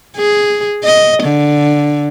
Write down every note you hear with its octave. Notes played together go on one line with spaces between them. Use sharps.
G#4
D#5
D3